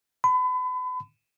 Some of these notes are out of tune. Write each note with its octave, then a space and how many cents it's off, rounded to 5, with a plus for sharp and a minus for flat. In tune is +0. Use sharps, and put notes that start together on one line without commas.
B5 +35